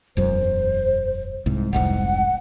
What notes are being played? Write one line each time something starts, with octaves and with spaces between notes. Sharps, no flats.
E1 F#2 C5
C2 G#2
F1 C2 G#2 F#5